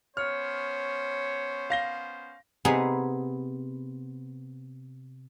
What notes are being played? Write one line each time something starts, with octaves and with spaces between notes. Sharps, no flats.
B3 C#4 C5 C#5 F6
F5 A#6 G7
C3 B3 C4 D#4 G#4 G#5